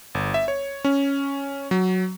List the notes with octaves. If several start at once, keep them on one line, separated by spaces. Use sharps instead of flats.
G1
E5
C#5
C#4
F#3